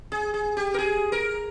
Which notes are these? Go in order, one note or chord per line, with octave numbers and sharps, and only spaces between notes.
G#4
G#4
G4
A#4
G#4
A#4